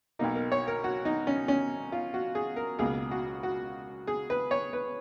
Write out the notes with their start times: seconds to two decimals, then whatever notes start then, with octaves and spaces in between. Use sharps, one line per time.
0.19 B1 B2 A#3 D#4
0.35 A#4
0.52 C#5
0.67 A#4
0.84 F#4
1.05 D#4
1.27 C#4
1.48 C#4
1.92 F4
2.14 F#4
2.35 G#4
2.56 A#4
2.78 C#2 B2 A#3 G#4
3.11 F#4
3.43 F#4
4.07 G#4
4.30 B4
4.51 C#5
4.73 B4